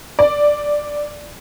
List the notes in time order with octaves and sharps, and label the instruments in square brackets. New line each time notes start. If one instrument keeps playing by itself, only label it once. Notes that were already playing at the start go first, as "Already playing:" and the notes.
[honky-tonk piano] D5